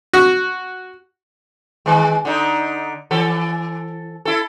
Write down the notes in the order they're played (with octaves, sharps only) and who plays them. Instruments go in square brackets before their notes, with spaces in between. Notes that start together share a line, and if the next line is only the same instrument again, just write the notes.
[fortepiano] F#4
[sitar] D#3 G#3
D3 D#4
E3 A4
E4 A4